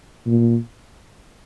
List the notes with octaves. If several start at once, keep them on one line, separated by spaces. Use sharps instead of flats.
A#2